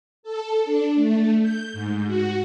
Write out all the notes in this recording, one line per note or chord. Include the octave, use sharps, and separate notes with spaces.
A4
D4
A3
G6
G#2
F#4